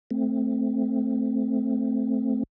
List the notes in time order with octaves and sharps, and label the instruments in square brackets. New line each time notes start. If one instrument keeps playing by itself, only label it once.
[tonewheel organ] A3 C4